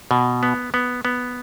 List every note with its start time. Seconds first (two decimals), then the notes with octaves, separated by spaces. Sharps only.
0.11 B2
0.43 B3
0.74 B3
1.05 B3